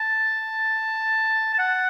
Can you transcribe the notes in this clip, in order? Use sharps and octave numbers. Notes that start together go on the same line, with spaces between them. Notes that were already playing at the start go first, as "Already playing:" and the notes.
Already playing: A5
A5
F#5